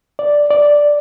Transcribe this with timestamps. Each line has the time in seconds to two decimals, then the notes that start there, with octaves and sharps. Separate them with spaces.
0.19 D5
0.51 D5